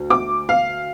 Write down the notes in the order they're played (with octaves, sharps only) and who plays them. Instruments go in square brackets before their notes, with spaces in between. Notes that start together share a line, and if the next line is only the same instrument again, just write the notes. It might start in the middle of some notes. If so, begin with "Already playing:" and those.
Already playing: [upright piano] D2
D6
F5